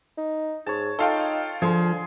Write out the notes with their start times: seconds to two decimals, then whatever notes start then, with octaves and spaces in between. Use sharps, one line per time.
0.17 D#4
0.66 G#2 C#5 A5
0.99 D#4 F4 A4 F5 G5
1.62 D3 F3 G#4 C6